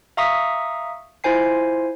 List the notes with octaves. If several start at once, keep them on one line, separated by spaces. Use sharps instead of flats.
E5 F5 A#5 C#6 D#6 B6
E4 F4 C5 G#5 C7